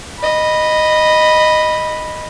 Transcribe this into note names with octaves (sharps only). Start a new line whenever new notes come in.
D#5 B5